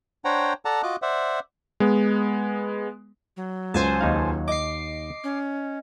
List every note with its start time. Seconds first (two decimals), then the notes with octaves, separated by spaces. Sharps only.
0.25 D4 C5 C#5 F#5 G5 A#5
0.65 A4 D5 F#5 A5 A#5
0.83 F4 F#4 D#5 D6 F#6
1.02 C5 D5 E5 F#5
1.80 G#3 B3
3.37 F#3
3.74 C#2 C5 G#5 A5
4.01 D#2 D#4 F5
4.48 D#5 D6 C7
5.24 C#4